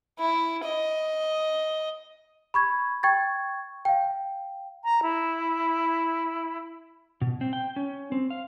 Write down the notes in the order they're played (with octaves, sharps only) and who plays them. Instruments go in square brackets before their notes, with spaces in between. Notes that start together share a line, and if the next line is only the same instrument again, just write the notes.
[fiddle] E4
D#5
[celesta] B5 C#6 G#6
G5 C#6 G#6 A6
F5 G5
[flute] A#5
E4
[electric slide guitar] B2
C4
G5
C#4
C4
F5